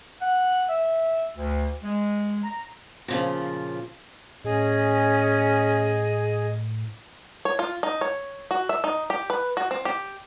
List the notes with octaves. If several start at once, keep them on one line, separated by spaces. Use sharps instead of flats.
F#5
E5
D2
G#3
A#5
A#2 C#3 F3
A2 C#4 G#4 D#5
C#5
F4
D#4
C#5
F#4
E5
D#4
G4
B4
F#4
C4
G4